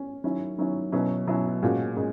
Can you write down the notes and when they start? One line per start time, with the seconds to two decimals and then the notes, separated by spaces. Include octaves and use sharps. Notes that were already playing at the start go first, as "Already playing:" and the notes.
Already playing: C#4
0.24 D#3 F#3 C#4 E4
0.58 D#3 F#3 C#4 E4
0.92 B2 F#3 C#4 E4
1.27 B2 F#3 C#4 E4
1.63 A#2 G#3 C#4 F#4
1.96 A#2 G#3 C#4